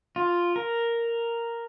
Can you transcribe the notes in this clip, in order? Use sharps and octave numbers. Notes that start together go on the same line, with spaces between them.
F4
A#4